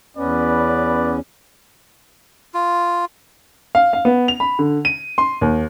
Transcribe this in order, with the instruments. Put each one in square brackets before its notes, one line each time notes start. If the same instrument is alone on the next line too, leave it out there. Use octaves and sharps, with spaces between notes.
[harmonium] E2 C#4 [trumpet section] B3 B4 D5
[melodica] F4
[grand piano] F5
F5
B3
F7
B5
D3
D#7
C6
D#2